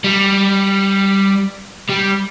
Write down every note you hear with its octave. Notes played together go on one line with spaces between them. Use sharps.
G3
G3